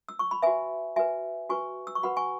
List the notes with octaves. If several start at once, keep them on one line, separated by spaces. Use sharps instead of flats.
E6
C#6
B5
F#4 B4 E5 G#5
F#4 B4 E5 G#5
F#4 B4 G#5 C#6
E6
C#6
F#4 B4 F#5 B5
G#5 C#6